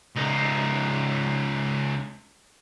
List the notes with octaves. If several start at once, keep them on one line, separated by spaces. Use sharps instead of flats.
C#2 D#4